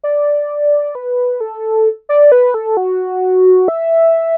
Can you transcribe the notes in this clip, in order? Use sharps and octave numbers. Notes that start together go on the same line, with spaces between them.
D5
B4
A4
D5
B4
A4
F#4
E5